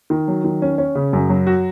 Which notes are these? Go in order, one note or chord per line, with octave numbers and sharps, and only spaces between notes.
D#3
F#3
D#3
C#4
C#4
C#3
F#2
F#3
F#4